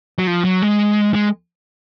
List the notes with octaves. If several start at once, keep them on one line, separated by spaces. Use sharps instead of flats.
F#3
F3
F#3
G#3
G#3